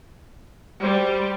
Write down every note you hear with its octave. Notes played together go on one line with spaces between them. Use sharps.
G3 C5